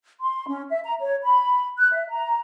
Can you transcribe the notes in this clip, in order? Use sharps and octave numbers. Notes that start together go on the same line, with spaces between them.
C6
C#4
E5
A#5
C#5
B5
F#6
E5
A#5